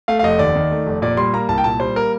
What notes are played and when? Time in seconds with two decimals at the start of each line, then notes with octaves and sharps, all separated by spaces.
0.08 A3 F5
0.19 F5
0.23 F1 D#5
0.39 D#2 D5
0.55 D#3
0.71 A3
0.87 F1
1.02 A#2 D5
1.17 G3 C6
1.33 A#3 A#5
1.49 C2 A5
1.58 G5
1.64 A#2 A5
1.80 G3 C5
1.96 A#3 A#4